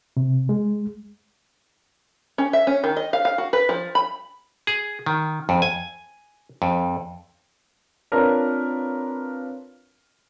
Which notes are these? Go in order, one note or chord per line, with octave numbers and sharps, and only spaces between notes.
C3
G#3
C#4
E5
C#4
D#3
D#5
F5
F5
F#4
B4
F3
B5
G#4
D#3
F2
G#5
F2
C4 D4 F4 A#4 B4 C#5